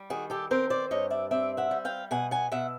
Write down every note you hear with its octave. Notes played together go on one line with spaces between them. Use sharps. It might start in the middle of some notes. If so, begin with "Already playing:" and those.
Already playing: G3
D#3 F#4 G#4
G4 A4
C4 A#4 C5
C5 D5
G2 C#5 D#5
D5 E5
C4 D5 E5
E5 F#5
G3
F5 G5
B2 F#5 G#5
F#5 G#5
B2 E5 F#5